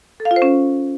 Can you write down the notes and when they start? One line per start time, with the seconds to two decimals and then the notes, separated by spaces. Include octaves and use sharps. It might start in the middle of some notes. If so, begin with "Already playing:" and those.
0.20 A4
0.25 F5
0.31 F4
0.36 C5
0.42 C#4